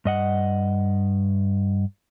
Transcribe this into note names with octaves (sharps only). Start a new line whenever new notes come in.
G2 D#5 F#5